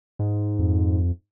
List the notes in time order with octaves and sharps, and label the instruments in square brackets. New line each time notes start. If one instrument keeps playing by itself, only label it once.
[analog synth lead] G#2
[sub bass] F2